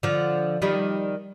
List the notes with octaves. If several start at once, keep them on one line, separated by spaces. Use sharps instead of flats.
D3 F3
D#3 G3